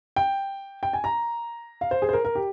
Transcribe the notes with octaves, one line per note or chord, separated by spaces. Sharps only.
G5
G5
G#5
A#5
F5
C5
G#4
C5
A#4
A#4
G4